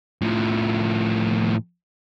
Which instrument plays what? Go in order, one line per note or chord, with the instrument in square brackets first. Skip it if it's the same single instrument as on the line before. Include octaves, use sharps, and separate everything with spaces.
[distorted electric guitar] A2 F3